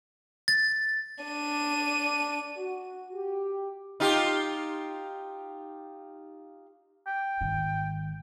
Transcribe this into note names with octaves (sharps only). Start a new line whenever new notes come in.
A6
D4 D#7
F#4
G4
D#4 F4 G4
G5
G#1 D#3